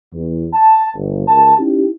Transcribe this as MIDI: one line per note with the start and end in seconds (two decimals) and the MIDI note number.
0.14 0.47 40
0.54 0.88 81
0.96 1.24 31
1.28 1.54 37
1.28 1.54 70
1.28 1.54 81
1.59 1.87 61
1.59 1.87 63
1.59 1.87 64
1.59 1.87 67